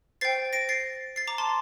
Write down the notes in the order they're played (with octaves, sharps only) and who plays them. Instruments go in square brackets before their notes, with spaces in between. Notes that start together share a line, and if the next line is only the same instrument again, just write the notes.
[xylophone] C5 G5 A6 C7
A#6 D7
A6 C7
A6 C7
A#5 D6
A5 C6